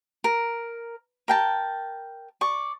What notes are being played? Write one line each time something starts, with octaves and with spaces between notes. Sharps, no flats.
A#4
A#4 G5 A5
D5 C#6